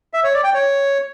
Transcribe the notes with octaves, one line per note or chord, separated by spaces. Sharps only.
E5
C#5
D5
G5
C#5